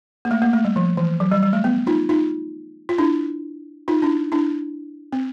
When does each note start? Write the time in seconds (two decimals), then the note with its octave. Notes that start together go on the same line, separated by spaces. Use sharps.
0.25 A#3
0.31 A3
0.42 A#3
0.53 A3
0.65 G3
0.76 F3
0.97 E3
1.20 F#3
1.31 G3
1.42 G3
1.53 A3
1.64 B3
1.87 D#4 F4
2.09 D#4 F4
2.89 F4
2.98 D4 E4
3.88 D#4 F4
4.02 D4 E4
4.32 D4 E4
5.13 C4